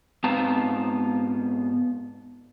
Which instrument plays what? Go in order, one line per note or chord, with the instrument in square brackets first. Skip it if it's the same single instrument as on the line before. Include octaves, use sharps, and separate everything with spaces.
[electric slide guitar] G#2 B3 C4 F5 A5 A#5